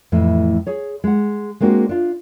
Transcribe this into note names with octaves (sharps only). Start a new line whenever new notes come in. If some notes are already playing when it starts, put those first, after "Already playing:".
F2 A2 E3 A3
G#4 C#5
G#3 F#5
G#3 A#3 C4 D4 F#4
D4 F4